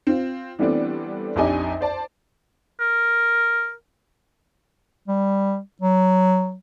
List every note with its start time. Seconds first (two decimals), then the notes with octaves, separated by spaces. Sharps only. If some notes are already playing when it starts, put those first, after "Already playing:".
0.07 C4 F4
0.59 E3 G3 A3 B3 C4 D4
1.36 A#1 F2 D4 D#4 G4 G#5
1.81 C5 D5 A5
2.80 A#4
5.08 G3
5.82 F#3